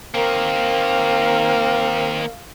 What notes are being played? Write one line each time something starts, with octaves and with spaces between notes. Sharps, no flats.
D#3 A#3 C4 A#4 F5